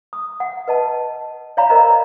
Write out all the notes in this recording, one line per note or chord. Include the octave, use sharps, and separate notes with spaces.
D#6
F#5
B4 D#5 A5
C#5 D5 F5 A#5 B5
A#4 C5 D5 D#5 F5 A#5